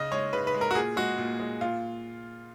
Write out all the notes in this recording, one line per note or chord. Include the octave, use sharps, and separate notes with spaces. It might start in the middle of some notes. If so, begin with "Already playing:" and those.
Already playing: C#3 D#5
G#3 C#5
C#3 B4
B4
G#3
A#4
F#4
A#2 G#4
G#3 F#4
A#2
G#3
A#2 F4